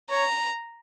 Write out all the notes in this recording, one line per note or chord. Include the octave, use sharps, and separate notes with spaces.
C#5 A#5